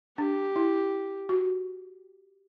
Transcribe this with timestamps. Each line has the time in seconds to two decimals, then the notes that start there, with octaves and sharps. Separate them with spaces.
0.18 D4 G4
0.56 E4
1.29 F#4